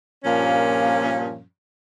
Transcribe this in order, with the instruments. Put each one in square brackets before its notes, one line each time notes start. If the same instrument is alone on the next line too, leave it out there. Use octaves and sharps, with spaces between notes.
[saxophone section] G2 A#2 F3 A#3 C#4